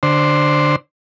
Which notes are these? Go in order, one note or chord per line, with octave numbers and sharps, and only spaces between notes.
D3 C5